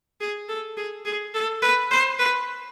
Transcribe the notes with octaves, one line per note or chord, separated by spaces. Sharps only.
G#4
A4
G#4
G#4
A4
B4
C5
B4